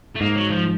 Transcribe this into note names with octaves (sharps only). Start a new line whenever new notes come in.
A3
G#2 A#3
F#3
F3